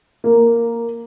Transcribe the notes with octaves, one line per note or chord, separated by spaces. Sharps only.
A#3